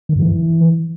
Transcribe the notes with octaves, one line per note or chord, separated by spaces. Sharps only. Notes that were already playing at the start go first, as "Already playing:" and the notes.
D#3
G2
E3